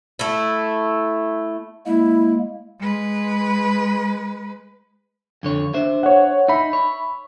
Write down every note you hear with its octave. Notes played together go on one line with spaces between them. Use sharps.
A3 E4
G#3 A#3 E4
G#3 B4
F2 D3 C#5
D4 C5 E5
C#5 F#5
D#4 E5 B5
C#5